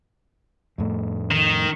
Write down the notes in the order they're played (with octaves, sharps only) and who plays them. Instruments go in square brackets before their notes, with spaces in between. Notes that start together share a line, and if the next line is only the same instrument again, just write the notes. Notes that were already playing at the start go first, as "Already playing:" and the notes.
[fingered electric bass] F2 A2 A3
[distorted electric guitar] D#3